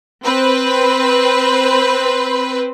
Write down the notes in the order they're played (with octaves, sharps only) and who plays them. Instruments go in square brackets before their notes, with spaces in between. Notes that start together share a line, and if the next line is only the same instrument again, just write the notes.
[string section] C4 B4 C5